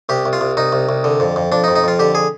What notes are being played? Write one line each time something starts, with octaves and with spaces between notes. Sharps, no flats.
C2 G4
C2
F4
C2
C2 D#4
C2
C2
D3
F2
F2
F2 D4
D#4
F2
D#4
F2 F4
D3 G4
G#4